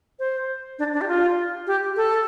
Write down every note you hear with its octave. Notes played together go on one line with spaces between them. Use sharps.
C5
D4
D4
G4
F4
G4
A4